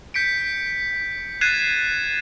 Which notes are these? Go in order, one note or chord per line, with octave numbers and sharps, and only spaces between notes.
G6 B6 C#7 D7
F#6 G#6 A6 C7 D#7 E7